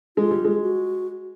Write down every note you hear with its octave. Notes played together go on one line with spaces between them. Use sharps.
G#3 F4
G3
G#3
F#4